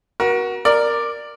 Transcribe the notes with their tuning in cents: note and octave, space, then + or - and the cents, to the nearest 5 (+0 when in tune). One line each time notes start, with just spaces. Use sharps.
F#4 +5 A#4 +35
A#4 +0 D5 +10